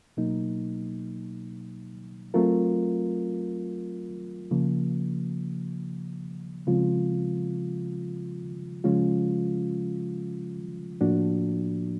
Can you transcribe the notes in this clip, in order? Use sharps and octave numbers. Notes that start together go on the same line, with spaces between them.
B2 F#3 A#3 D#4
F#3 A3 C4 F4 A#4
C#3 F3 A#3
C#3 F3 G#3 C4 F4
C#3 F3 G#3 C#4 F4
A2 F3 A#3 D4 F#4